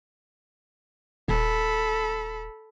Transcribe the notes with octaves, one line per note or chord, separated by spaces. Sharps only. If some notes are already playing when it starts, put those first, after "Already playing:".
D#1 A4 B5